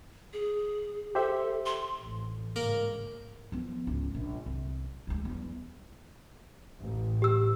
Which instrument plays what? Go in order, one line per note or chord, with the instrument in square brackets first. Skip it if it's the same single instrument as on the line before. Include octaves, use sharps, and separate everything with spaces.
[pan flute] G#4
[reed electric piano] G4 C5 E5 [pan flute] A4
[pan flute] C6
[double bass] A1
[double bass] G#2 C#3 [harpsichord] A#3 A#4
[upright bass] F3 B3
C#2 G#2
A#1
C2
D2 G#3
E2 G3
[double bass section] A1
[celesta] G4 E6